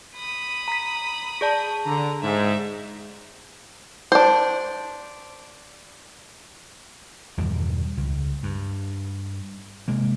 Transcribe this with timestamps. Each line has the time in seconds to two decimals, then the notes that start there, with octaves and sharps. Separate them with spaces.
0.15 B5 D#6
0.68 A#5 B6
1.41 G#4 D5 A5
1.84 D3 A#5
2.23 G#2 E5
4.12 D4 C5
7.38 E2 G2 B2 D#3
7.97 C#2
8.43 G2
9.88 C3 G#3 A#3